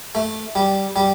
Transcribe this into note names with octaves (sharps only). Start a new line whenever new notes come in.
A3
G3
G3